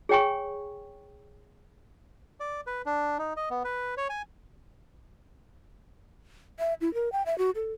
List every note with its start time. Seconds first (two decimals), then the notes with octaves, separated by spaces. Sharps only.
0.09 G#4 C#5 G5 G#5 C#6
2.40 D5
2.67 B4
2.86 D4
3.18 D#4
3.36 D#5
3.50 B3
3.65 B4
3.97 C#5
4.09 G#5
6.59 E5
6.81 E4
6.94 A#4
7.12 G5
7.26 E5
7.38 F#4
7.55 A4